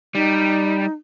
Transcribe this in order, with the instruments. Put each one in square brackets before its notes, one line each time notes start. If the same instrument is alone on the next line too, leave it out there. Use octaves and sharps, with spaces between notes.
[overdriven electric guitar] G3 [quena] D#4